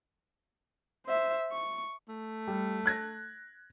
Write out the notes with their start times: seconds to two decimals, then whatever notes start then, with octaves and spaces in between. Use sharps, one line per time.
1.06 C5 E5
1.52 C#6
2.09 A3
2.48 G3
2.86 F#6 G#6 A#6